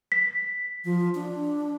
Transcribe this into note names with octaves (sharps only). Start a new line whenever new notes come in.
B6
F3
D4